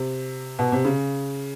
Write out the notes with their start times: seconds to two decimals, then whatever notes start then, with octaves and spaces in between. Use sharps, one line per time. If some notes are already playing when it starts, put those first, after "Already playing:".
Already playing: C3
0.59 B2
0.72 C3
0.85 C#3